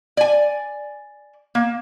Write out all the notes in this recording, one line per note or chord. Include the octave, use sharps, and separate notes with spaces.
D5 G#5
A#3